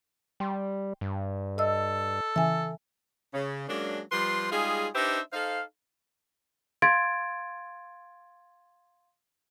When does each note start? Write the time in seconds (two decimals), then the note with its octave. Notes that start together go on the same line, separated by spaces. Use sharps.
0.40 G3 G5 C6
1.01 G2
1.58 A4 D#5 E5 E6
2.36 C#3 E3 E5 G#5
3.34 C#3
3.68 F#3 G#3 A#3 C#4 D4
4.12 F3 G3 B4 C6
4.52 G3 G#3 D#4 F4 G#4
4.95 D4 D#4 G4 B4 C5 E5
5.33 D#4 A4 C5 F5
6.82 F5 C6 G#6 A6 D7